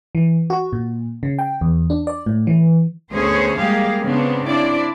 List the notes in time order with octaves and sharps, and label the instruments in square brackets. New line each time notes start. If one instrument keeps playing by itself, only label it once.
[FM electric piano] E3
F#4
A#2
C#3
G5
E2
D4
D5
A2
E3
[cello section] D2 B3 C#4 G#4 C5 C#5
G3 G#3 A#3 G4 G#4 F5
C#3 B3 C4 D4
C4 D4 E4 D5